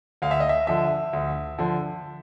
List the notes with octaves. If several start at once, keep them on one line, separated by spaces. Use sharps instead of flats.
D2 F5
E5
D#5
E5
D3 F3 E5
D2
D3 F3